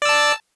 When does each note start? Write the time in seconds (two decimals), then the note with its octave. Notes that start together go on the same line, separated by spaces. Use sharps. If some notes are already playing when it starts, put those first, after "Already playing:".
0.02 D5
0.05 E6
0.09 A5